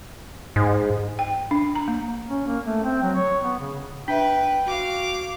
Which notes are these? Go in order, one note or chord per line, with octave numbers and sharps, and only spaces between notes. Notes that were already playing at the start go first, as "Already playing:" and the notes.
G#2
G5
D4
A#5
A#3
C#4
A#3
A3
C4
F#3
C#5
B3
C#3
D4 B4 E5 G5
F#4 F5 D6